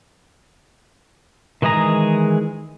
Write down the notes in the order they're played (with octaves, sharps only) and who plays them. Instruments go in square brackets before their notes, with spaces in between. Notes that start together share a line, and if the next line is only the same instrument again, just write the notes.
[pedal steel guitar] D#3 E3 G#3 G#4 A#5